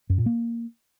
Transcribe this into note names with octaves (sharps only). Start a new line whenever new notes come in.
F#2
A#2
A#3